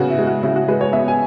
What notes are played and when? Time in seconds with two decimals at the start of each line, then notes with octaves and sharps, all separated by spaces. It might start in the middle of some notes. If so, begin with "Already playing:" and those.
Already playing: C#3 B3 F#4
0.10 E4
0.19 G#3
0.27 F#4
0.43 C#3 E4
0.56 F#4
0.68 G#3 B4
0.81 C#5
0.93 B3 E5
1.08 G#5